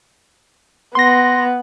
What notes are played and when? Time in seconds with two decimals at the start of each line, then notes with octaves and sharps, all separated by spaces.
0.95 B3 C6 A#6